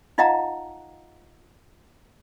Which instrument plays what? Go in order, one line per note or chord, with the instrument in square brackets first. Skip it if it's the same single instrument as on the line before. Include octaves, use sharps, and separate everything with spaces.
[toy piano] D#4 F4 D#5 F5 F#5 A#5